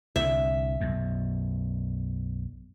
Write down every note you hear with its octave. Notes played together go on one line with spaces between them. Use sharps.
C2 D3 E5
B1 F#2